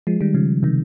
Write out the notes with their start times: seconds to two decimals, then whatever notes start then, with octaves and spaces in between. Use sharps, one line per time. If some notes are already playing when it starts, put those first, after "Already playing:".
0.07 F3 G#3
0.21 D#3 G3
0.35 C#3 F3
0.63 C3 D#3